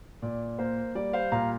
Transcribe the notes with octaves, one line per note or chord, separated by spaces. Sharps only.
A#2 D5
A#3 C5
G3 D5
C5 F5
A#2 F5 A#5